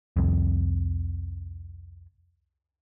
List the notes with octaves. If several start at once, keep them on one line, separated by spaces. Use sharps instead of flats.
C2 F2